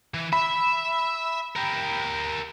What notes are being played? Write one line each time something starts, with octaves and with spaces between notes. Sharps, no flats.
E3
E5 B5
G4 A#4